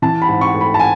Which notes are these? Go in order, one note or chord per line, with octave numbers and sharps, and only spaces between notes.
E3 A5
B5
G#2
C#6
A3
B5
A5
G#5